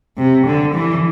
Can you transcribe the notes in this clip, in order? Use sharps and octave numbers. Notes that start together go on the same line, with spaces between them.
C3
D3
E3